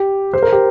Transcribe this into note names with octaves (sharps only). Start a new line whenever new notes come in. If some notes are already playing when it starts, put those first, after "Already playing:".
Already playing: G4
C5
A#4
G4